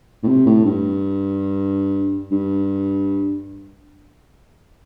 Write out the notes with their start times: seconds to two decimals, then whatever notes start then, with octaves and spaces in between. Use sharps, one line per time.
0.23 A2
0.27 C3
0.46 A2
0.64 G2
2.31 G2